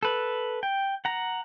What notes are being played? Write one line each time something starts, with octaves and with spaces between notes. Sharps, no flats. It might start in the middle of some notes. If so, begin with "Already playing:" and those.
A4 B4
G5
F#5 A#5